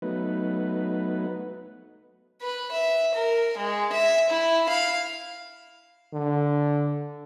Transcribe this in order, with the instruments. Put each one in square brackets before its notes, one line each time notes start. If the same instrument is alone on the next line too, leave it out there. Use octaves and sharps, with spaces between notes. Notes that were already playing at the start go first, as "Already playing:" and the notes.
[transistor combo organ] F#3 A3 B3 D#4 B4
[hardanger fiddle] B4
E5
A#4
G#3
E5
E4
F5
[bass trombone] D3